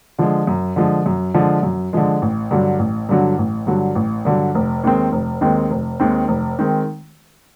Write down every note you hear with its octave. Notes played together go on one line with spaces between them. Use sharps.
D3 F3 G#3
F#2
D3 F3 G#3
F#2
D3 F3 G#3
F#2
D3 F3 G#3
A1
G2 D3 F#3
A1
G2 D3 F#3
A1
G2 D3 F#3
A1
G2 D3 F#3
F1
D#2 D#3 G#3 C4
F1
D#2 D#3 G#3 C4
F1
D#2 D#3 G#3 C4
F1
D#3 G#3 C4